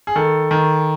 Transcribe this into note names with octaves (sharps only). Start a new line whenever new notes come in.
G#4
D#3 A4
D#3